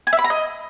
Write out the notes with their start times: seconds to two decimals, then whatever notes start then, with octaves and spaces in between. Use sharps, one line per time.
0.07 G#5
0.13 E5
0.19 B5
0.24 A#5
0.30 D#5